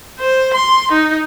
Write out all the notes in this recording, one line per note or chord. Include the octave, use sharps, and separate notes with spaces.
C5
C6
D#4